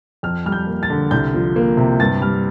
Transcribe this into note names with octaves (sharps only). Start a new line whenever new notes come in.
F2 F6
G3 F6
G6
A#3
A6
D3
C2 G6
F3
A#3
C3
G2 A6
G3 F6